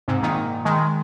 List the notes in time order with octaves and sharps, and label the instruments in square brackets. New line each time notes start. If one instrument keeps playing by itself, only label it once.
[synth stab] G#2 C3
A#2 D#3
D#3 G#3